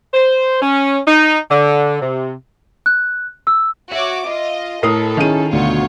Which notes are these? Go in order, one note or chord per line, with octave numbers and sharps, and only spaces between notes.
C5
C#4
D#4
D3
C3
F#6
E6
F#4 C#5 E5 D6
F4 D#5
A2 A4 A#4 D#6 C7
D#3 C#4 E4 G#4 D#7
D2 B2 D3 F4 C#5